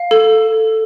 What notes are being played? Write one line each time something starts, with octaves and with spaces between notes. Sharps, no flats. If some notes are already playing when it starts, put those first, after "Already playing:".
Already playing: F5
A4